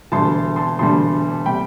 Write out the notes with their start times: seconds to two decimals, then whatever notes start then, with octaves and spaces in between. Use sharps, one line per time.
0.12 E1 D2 D3 G3 A5 C6
0.56 A5 C6
0.79 E1 D2 D3 G3 A5 C6
1.46 C3 G3 G5 B5